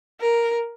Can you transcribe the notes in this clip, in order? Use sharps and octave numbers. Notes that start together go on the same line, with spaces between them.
A#4